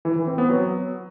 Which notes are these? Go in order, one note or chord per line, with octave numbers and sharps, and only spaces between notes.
E3
E3
C4
B3
F#3